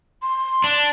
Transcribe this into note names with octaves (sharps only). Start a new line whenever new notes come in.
C6
D4